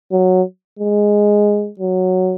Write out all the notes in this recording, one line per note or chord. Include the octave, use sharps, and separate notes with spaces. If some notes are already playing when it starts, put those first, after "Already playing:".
F#3
G#3
F#3